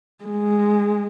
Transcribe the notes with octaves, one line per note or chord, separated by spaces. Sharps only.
G#3